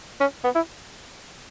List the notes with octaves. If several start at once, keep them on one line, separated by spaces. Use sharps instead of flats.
C#4
B3
E4